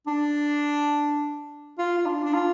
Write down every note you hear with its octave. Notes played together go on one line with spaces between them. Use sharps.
D4
F4
F4
D4
D4
F4